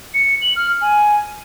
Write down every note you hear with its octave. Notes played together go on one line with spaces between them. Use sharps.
C#7
F#7
F6
G#5